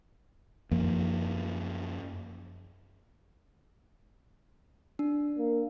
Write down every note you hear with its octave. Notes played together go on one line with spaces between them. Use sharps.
F#2 F3 A#3
D4
A#3